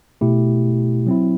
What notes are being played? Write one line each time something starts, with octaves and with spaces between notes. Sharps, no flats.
B2 A3 E4 G4
F#3 C4 E4